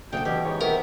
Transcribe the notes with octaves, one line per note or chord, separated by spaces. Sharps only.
D2 C#3 C#4 D4 G5
B2 E3 G4
G#2 C#5
C3 B3 E4 A#4